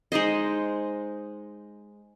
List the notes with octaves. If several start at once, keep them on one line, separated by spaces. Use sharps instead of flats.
G#3 D#4 C5 D#5